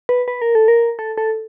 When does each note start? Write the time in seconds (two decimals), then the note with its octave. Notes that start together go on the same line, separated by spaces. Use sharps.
0.09 B4
0.28 B4
0.42 A#4
0.55 A4
0.68 A#4
0.99 A4
1.18 A4